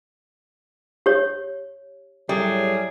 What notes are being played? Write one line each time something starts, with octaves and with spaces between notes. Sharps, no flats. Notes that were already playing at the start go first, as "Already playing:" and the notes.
G4 C#5
A2 F#3 G3 G#4